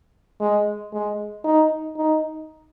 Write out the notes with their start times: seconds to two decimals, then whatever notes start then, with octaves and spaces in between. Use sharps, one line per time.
0.41 G#3
0.93 G#3
1.44 D#4
1.96 D#4